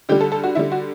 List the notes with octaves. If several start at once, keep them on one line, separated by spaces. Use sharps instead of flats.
D3 G3 G4
A4
A4
F#4
D3 G3 E4
F#4